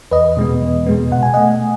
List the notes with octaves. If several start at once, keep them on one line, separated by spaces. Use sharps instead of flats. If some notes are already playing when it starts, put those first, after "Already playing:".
E2 B4 D#5
B2 G#3 B3
E2
B2 G#3 B3
B2 F#5
G#5
A3 D#5 F#5